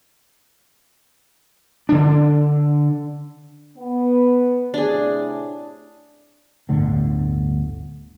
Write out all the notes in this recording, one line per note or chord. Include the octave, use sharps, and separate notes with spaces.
D3 D4
B3
A2 C3 D4 G#4 D5
D1 G1 A2 D3